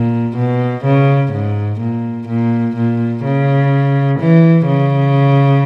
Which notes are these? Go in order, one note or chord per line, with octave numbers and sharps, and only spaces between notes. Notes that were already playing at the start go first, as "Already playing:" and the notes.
Already playing: A#2
B2
C#3
G#2
A#2
A#2
A#2
C#3
E3
C#3